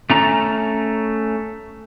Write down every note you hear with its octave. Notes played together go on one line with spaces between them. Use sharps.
A3 C#4 A#5